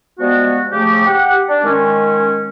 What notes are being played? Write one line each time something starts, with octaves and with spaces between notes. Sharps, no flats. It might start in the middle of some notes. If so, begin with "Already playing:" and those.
F3 G3 G#3 B3 F#4
C#3 F3 A3 G4
G4 F#5
D4
D#3 G#3 C#4